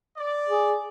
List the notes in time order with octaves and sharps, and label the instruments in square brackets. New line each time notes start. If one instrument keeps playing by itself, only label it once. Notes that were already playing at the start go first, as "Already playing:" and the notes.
[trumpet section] D5
[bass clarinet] G#4